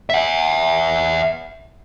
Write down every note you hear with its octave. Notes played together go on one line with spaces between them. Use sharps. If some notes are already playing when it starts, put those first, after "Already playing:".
E5 F#5